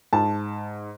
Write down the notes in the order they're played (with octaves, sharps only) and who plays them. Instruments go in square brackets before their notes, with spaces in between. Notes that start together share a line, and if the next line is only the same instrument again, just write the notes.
[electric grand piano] G#2 [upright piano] A5